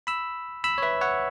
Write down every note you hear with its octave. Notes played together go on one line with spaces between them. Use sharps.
B5 E6
B5 E6
C#5
B4 E5
C#5 F#5